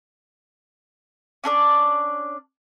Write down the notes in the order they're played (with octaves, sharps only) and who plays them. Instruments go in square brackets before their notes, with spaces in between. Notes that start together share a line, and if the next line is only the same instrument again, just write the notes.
[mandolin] C#4 D4 A4 D5